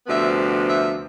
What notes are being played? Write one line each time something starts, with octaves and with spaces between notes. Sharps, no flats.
D2 C3 F3 B3 E5
E5